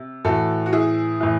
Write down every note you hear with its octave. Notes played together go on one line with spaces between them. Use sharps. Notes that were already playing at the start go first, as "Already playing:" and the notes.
Already playing: C3
A2 E3 F#4 A4
F#4
E4 G#4
A2 E3